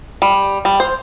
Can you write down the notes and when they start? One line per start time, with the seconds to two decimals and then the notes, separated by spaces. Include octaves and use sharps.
0.22 G3
0.65 G3
0.80 C5